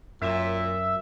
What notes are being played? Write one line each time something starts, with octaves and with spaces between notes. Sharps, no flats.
F#2 A#2 E5